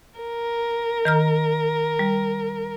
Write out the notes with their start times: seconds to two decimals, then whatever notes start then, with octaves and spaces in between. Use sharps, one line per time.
0.20 A#4
1.05 D#3 A#5 F6
1.99 G3